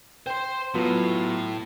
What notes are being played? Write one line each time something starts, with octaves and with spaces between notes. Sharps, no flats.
C5 G5 C6
A2 F#3 B3 F4